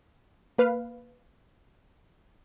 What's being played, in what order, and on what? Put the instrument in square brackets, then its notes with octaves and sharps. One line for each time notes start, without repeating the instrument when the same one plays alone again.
[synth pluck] A#3 B4 F5